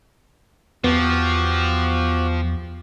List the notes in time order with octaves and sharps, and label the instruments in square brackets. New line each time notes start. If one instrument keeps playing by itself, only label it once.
[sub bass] E2 [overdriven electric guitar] F3 [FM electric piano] B3 [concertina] F#4 G4